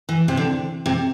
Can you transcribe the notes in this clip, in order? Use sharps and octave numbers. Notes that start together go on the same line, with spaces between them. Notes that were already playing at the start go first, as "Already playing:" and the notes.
E3
C3
D3
C3